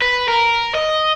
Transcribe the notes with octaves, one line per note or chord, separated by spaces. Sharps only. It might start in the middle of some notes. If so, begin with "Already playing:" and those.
B4
A#4
D#5